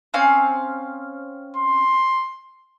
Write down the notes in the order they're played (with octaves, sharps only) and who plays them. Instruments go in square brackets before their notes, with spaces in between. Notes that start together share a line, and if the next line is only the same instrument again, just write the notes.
[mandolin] C4 C#4 F5
[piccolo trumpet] C6